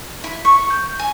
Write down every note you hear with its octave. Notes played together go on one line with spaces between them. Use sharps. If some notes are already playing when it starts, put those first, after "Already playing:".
E4
C#6
G6
G#5